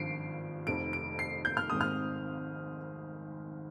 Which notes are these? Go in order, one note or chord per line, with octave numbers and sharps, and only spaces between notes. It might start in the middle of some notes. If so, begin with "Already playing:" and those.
Already playing: G#1 G2 F3 C7 D7
F1 F2 D#3 D7
D7
C7
G6
F6
G#1 G#2 D#3 G#3 C4 D#6
F6